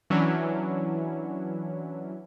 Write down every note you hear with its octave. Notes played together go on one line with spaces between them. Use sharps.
E3 F#3 C#4 D4 E4